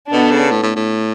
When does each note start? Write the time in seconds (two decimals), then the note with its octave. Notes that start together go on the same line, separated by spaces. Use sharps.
0.12 B2 B3 D4 A4
0.31 C#3
0.51 A2
0.63 A2
0.76 A2